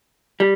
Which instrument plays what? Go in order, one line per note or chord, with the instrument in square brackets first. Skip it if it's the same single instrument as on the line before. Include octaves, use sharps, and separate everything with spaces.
[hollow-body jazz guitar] G3